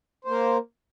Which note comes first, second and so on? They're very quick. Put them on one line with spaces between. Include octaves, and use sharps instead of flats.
C5 A#3 A#4